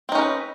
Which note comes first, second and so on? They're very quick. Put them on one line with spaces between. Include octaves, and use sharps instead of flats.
C4 D#4 C#4 A#4 B4